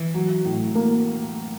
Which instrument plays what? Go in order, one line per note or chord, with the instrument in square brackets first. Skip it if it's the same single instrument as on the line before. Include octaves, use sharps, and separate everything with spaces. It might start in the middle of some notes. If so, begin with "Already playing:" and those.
Already playing: [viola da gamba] E3
[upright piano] F#3
A2
A#3